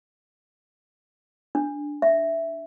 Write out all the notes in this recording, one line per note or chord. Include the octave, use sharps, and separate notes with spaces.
D4
E5